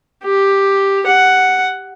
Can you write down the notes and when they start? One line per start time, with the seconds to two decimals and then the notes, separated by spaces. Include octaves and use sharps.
0.24 G4
1.06 F#5